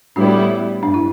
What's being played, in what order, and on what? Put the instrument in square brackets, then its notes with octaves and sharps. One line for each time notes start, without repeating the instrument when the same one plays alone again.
[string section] A2 G3 B3 E4 [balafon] D4 F#4
[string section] G2 [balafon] D4
[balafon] E4